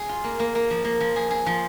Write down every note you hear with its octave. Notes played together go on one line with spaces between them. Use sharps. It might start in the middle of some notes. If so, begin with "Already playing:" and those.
Already playing: G#4
F4
A#3
A#3
A#3
F3
A#3
F3
G#4
G#4
F3